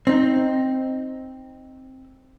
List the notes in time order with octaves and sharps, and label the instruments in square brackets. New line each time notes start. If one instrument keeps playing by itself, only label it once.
[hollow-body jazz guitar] C4 D#4